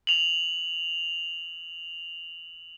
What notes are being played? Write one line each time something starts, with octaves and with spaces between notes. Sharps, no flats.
F7 F#7